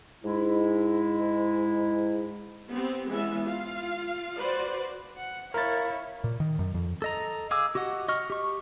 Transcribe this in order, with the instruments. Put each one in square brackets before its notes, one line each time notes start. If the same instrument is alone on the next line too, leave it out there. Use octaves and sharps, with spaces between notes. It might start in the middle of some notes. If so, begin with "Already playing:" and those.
[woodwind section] G#2 G#3 E4
[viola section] B3 C4 G4
E3 G#3 B3 C#4 E5
F4 F5
F#4 B4 C5 D5
[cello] F#5
[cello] E4 C#5 [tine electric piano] A#4 A6 [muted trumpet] F5
[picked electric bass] A#2
D#3
F#2
F2
[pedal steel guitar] A4 D#5 A#5
G#4 F5 G#5 D6 E6
F#4 G4 D#5 F#5
D#5 C#6 F6
G4 C#6